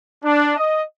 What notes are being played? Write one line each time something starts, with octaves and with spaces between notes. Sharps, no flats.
D4
D#5